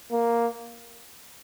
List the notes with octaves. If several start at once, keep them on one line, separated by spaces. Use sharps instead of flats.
A#3